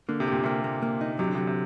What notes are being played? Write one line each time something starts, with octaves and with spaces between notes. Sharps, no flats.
D3 A#3
C3
A#2 G4
C3 A#3
A#3
A#3
D#4
C3 F#3
D3
C3 F#3
C3